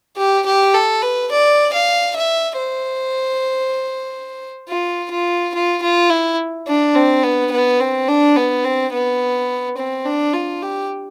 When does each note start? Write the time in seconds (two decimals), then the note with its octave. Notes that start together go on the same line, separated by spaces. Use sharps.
0.17 G4
0.46 G4
0.74 A4
1.02 B4
1.31 D5
1.73 F5
2.16 E5
2.58 C5
4.69 F4
5.12 F4
5.55 F4
5.83 F4
6.11 E4
6.68 D4
6.95 C4
7.23 B3
7.52 B3
7.80 C4
8.08 D4
8.37 B3
8.65 C4
8.93 B3
9.77 C4
10.06 D4
10.34 F4
10.62 G4